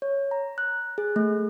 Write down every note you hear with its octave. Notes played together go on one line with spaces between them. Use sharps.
C#5
A#5
F#6
G#4
A3